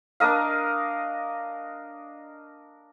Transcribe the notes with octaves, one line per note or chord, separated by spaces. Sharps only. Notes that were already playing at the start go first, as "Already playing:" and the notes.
D4 A#4 D#5 F5